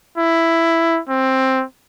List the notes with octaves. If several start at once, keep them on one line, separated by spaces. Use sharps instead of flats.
E4
C4